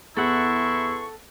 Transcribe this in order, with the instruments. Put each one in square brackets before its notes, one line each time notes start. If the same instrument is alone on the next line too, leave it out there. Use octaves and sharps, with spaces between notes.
[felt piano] E2 [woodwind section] E3 C6 C#6 [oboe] E4 [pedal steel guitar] A4 F#5